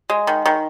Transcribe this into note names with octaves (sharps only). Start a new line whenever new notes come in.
G#3
D#3
D#3